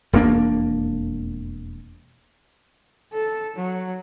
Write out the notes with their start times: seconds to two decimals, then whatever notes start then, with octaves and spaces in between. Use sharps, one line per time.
0.13 E1 F2 A#3 D4
3.13 A4
3.56 F#3